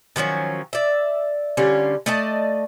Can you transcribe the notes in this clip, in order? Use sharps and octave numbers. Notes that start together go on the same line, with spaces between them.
D#3 F3 F#3 C#4
D5 E5
D3 G3 C#4 F4
A3 D5 D#5 A5